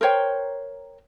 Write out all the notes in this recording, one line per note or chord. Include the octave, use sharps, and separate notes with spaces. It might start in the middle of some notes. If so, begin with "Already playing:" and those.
A#4 C5 C#5 G5